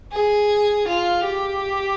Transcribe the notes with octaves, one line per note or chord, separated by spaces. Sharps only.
G#4
F4
G4